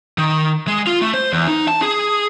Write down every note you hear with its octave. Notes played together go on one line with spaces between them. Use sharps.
D#3
G#3
F4
A3
C5
E2
D#4
A5
G#4